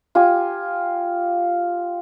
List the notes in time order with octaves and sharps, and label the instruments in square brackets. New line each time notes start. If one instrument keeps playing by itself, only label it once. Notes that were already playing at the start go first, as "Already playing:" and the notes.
[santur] F4 G4 G#5